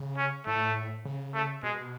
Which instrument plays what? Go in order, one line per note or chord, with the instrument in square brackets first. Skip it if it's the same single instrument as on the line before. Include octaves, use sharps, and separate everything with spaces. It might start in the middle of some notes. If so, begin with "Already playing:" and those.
Already playing: [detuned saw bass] C#3
[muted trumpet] C#4
[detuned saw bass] A2 [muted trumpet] A3
[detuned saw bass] C#3
[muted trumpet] A3
[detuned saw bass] B2 [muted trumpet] G#3